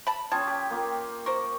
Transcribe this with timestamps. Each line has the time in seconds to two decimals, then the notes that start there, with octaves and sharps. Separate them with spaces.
0.07 A5 B5
0.32 C#4 F4 G5 A5 D#6 G#6
0.47 G4
0.70 A#3 F4 G4
1.26 A#4 C5 C#6